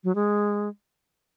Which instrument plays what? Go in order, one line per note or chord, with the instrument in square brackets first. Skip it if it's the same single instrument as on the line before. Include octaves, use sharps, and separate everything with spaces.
[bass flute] F#3
G#3